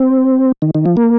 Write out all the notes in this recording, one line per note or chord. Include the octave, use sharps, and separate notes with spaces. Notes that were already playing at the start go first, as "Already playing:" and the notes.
Already playing: C4
D#3
D#3
F3
A#3